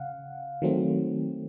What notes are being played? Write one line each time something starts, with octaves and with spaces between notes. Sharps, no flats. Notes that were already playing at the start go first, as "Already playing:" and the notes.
Already playing: C#3 F5 F#5
D#3 F#3 A3 C4